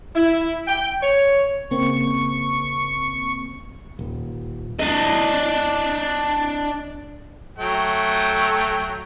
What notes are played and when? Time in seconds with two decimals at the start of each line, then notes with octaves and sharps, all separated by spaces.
0.15 E4
0.68 G5
1.03 C#5
1.71 C#3 A#3 C4 C#6
3.99 D#1
4.79 D4 D#5
7.59 F#3 A3 G5